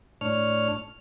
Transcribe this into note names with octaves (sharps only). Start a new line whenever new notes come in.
A2 D4 C#5 F6